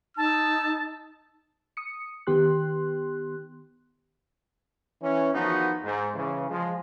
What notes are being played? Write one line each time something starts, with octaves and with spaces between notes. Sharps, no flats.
D#4 A5 E6
D#6 C#7
D#3 B3 G4 C6 F#6
E3 C#4
E2 D#3 F3 B3 D#4 F#4
G#2
C#3 E3
F3 G#3